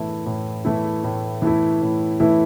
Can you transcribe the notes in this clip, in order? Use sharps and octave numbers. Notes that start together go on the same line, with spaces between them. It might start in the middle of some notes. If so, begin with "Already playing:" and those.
Already playing: A2 E3 A3 E4
A2
E3 A3 E4
A2
E3 A3 E4
A2
E3 A3 E4